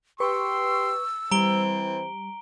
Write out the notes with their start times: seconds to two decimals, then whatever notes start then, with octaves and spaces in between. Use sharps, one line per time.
0.20 G4 B4 C6 C#6 E6
1.31 E3 G3 C4 C5 A#5 D7 G7